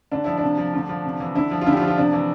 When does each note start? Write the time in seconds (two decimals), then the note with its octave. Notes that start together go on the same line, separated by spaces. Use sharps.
0.12 D3 D4
0.24 F3 E4
0.37 D4
0.43 C3
0.58 F3
0.74 D3
0.89 F3
1.05 C3
1.20 E3
1.35 D3 E4
1.51 F3
1.61 F4
1.66 D3 E4
1.73 G4
1.77 F4
1.82 F3
1.88 F4
1.98 C3 D4
2.13 E3